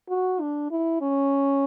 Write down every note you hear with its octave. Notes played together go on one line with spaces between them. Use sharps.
F#4
D4
E4
C#4